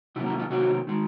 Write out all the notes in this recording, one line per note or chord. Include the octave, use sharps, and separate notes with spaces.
C3 D#3 F#3 A#3 E4
E4
F4
C3 D#3 F#3 A#3 F#4
D#3 G#3